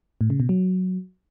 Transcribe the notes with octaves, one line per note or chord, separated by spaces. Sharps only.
A2
C#3
B2
F#3